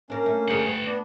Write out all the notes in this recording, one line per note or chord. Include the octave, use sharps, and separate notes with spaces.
A#3 C#4 D4 A#4
A3
D2 G4 G#4 F#5
B4
B3 D4